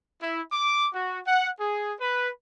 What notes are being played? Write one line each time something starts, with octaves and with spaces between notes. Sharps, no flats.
E4
D6
F#4
F#5
G#4
B4